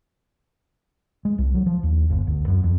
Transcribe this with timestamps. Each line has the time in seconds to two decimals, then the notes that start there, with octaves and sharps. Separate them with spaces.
1.25 G#3
1.38 C2
1.54 F#3
1.66 F3
1.83 D#2
2.10 G1
2.27 D2
2.48 F#2
2.64 F2